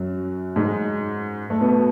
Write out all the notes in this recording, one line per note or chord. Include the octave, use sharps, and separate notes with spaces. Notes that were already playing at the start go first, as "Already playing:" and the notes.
Already playing: F#2 F#3
G#2 G#3
A3
B2 B3